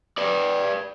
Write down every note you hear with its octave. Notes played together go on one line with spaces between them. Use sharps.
B4 D5